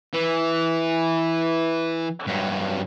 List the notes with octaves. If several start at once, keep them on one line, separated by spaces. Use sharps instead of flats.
E3
G2 F#3